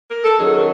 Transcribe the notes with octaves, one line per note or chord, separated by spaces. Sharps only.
A#4
A4
F#2 D#3 F#3 G#4